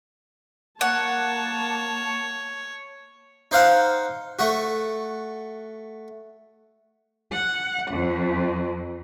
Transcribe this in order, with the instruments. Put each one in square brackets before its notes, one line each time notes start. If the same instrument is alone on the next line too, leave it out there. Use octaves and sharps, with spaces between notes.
[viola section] A#3 A5 [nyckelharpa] C#5 [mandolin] F#5
[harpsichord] D#4 C5 F5 F#5
A3 F#4
[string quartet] F#5
F2